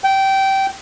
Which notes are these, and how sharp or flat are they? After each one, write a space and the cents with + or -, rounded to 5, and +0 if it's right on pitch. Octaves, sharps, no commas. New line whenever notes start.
G5 -15